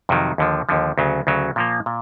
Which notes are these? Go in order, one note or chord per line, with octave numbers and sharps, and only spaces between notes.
F2 C3 D#3 F#3
D#2 D3 F3
D#2 D3 F3
D2 C#3 F#3
D2 C#3 F#3
A#2 F3 A#3
A#2